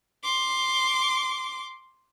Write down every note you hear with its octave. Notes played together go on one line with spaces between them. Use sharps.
C6 D6